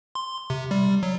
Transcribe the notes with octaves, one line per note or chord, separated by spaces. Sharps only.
C6
C3
G3
F#3